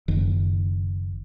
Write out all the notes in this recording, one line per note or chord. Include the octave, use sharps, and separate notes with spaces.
F#1 D#3